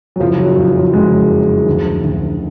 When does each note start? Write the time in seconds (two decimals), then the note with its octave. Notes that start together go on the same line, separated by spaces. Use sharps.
0.16 F#3
0.20 F#1 F3
0.38 F#3
0.57 F2 F3
0.76 F#3
0.93 F#1 G#3
1.30 F2
1.66 D2
2.03 D2